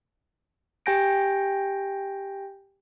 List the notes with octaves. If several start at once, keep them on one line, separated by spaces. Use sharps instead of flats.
G4 G5 G#5 G6 A#6 D7